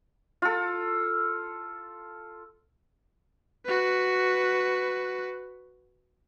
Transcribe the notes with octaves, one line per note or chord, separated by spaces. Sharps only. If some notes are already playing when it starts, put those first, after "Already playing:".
F4 A4
F#4 B4